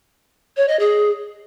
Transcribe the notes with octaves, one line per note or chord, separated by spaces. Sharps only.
C#5
D#5
G#4